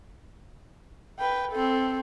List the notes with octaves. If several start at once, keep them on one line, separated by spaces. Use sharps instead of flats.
B4 G5
C4 A4